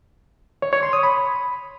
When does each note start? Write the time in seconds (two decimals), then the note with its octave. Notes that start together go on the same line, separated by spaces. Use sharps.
0.62 C#5
0.73 C#5
0.83 C6
0.93 D#6
1.03 B5